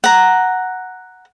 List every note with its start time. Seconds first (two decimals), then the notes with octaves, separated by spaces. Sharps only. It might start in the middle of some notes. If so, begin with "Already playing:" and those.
0.04 F#5 A#5